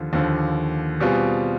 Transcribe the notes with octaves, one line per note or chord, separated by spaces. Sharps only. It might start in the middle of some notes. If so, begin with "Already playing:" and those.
Already playing: D#2 D3 F3
D#2 D3 F3
B2 G3 C4 F4 G#4